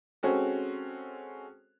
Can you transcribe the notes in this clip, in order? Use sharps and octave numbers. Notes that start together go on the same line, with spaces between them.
G#3 C4 C#4 F#4 A4